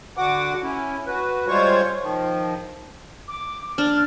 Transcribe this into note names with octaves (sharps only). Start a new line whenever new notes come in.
D3 F#4 F#5 D6
C#4 E4
F#4 B4
G3 G#3 F4 C5 C#5 C#6
D#3 F3
D6
D4 F6